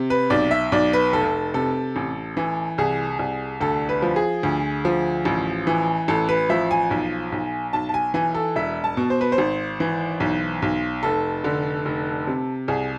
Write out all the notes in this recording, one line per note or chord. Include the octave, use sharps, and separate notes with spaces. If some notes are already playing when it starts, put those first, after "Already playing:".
Already playing: C3
B4
B1 D5
E5
B1 D5
B4
F1 A4
C3 A4
A1
E3
C2 G#4
C2
D2 A4
B4
F3
G#4
D2
F3
A1
E3
A1 A4
B4
F3 E5
G#5
B1
B1
B1 A5
A5
G#5
E3 G#5
A4
E1 E5
A5
B2
C5
B4
C5
G#1
E3
B1
B1
F1 A4
D3
F1
C3
C2 G#4